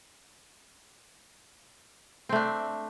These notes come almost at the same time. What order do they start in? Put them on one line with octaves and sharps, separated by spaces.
C4 A3 D4